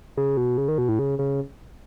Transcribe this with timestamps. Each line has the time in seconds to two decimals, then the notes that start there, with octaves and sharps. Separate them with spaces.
0.17 C#3
0.37 B2
0.58 C#3
0.68 D#3
0.78 B2
0.89 A2
0.99 C#3
1.19 C#3